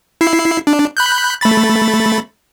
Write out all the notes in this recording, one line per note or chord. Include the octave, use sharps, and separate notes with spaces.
E4 C7
D4
B5 F#6 G6
A3 B5 A6